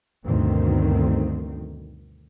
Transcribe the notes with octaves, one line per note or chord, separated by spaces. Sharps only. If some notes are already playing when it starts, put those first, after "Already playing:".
D2 G2 B2 D3 D#3 C4